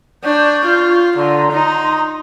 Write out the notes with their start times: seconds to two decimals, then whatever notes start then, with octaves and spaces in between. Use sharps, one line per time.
0.24 D4 C#6 G6
0.65 F4
1.16 D3 A#5 C6
1.51 D#4